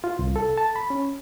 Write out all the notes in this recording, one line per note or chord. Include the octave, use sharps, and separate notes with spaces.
F4
C2
A4
A5
B5
C#4